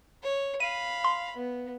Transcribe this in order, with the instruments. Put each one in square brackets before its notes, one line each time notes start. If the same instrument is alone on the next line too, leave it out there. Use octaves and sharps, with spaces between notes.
[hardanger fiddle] C#5
[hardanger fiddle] F5 B5 [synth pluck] D#7
[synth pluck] C6
[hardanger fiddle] B3